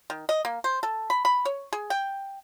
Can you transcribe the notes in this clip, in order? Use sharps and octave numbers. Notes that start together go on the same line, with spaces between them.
D#3
D#5
A#3
C5
A4
B5
B5
C#5
G#4
G5